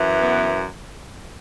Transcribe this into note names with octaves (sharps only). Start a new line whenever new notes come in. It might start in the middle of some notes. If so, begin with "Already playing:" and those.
Already playing: F#2 E3
B3